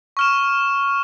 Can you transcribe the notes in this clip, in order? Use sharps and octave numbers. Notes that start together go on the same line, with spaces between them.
C#6 F6 E7